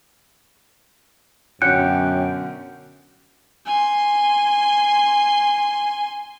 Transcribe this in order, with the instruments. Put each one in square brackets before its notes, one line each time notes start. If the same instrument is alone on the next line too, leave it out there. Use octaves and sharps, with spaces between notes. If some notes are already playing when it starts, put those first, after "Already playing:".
[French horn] F#2 [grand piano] B2 D3 C#4 [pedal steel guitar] G5 [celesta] F#6 C#7
[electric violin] G#5 C6